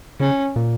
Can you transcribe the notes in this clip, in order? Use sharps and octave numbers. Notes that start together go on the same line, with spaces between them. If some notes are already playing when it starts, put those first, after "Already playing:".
C#3 C#4
A#2